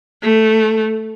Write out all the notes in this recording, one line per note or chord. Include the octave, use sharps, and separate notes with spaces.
A3